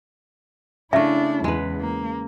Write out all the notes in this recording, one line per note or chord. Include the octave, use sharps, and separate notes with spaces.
C#3 A3 D4 E4 E5
E2 G#3 B4
A#3